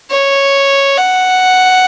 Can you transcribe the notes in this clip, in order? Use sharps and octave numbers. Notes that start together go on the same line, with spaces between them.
C#5
F#5